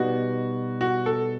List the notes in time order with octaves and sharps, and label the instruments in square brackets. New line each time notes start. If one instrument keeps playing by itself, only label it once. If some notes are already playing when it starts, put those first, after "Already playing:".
Already playing: [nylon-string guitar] B2 G3 B3 D#4 [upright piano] F#4
[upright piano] F#4
A4